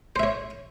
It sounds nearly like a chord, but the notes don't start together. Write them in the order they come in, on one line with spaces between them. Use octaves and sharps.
C5 E5 C#5